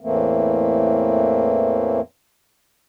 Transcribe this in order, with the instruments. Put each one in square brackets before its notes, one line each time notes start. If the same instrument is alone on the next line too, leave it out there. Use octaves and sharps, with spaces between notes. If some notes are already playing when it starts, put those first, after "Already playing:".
[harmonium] E2 A2 E3 A3 A#3 C4